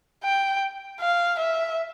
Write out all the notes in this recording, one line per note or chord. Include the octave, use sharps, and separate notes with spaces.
G5
F5
E5